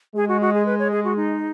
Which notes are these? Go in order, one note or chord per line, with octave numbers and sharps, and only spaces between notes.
G#3 G#4
F#4
F#4
G#4
B4
C#5
G#4
F#4
D#4